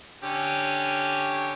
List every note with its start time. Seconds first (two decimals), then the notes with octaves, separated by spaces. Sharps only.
0.23 D3 C#4 G4